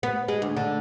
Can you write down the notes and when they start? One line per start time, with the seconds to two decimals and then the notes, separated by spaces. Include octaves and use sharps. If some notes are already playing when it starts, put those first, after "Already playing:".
0.03 B3
0.28 G#3
0.42 D2
0.56 D3